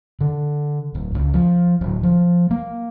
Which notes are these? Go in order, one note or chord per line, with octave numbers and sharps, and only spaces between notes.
D3
D1
C#2
F3
D1
F3
A#3